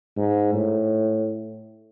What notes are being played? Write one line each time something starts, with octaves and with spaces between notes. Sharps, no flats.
G#2
A2